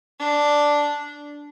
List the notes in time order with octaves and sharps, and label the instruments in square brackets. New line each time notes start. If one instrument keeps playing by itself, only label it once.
[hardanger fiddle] D4